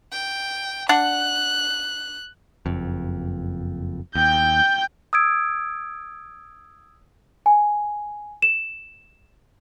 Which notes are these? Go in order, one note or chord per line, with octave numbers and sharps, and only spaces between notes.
G5
D4 F#5 F#6
F#1 F2
D#2 G5 G6
D#6 E6 G#6 D7
G#5
E7